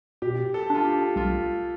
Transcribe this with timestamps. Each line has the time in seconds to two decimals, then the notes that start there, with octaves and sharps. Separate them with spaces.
0.22 B2 G4
0.54 A4
0.70 D4 F4
0.84 G4
1.16 C2 F4